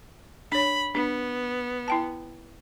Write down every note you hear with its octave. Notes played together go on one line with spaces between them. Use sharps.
D4 C#5 B5
B3 D4
E4 G5 A5